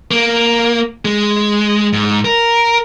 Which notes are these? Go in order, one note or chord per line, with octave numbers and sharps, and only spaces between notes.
A#3
G#3
G#2
A#4